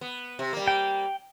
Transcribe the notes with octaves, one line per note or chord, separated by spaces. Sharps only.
B3
C3
G3 A#3
G5